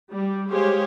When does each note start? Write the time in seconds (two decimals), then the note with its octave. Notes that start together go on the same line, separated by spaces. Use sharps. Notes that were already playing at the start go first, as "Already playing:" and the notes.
0.10 G3
0.50 G#3 G4 G#4 C5 C#5 F5